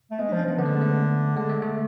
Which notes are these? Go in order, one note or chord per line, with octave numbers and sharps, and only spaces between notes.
A3
G#3 B3
D4
F3
C#4
F3 B3
D3 B3
A3
G#3
A3
D3 G#3
A3
A3